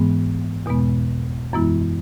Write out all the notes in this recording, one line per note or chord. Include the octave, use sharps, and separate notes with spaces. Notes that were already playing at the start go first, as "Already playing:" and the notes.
Already playing: G#2 E3 G#3 B3
E2 B2 G#3 B3
F#2 E3 G#3 B3 E4